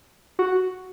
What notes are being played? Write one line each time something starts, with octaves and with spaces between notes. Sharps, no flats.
F#4